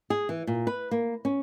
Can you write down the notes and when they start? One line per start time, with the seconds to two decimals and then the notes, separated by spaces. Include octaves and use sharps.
0.10 G#4
0.29 E3
0.47 A#2
0.67 B4
0.91 A#3
1.25 C#4